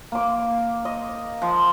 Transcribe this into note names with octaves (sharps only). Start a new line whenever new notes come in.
A#3 D6
D#5
F3